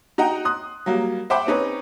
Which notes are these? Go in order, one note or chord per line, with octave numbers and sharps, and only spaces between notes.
D#4 F#4 D#5 F#5 G5 A#5
C6 D#6 F#6
F#3 G3 A#3
C5 E5 F#5 G5 B5 D6
C4 C#4 D#4 B4 C#5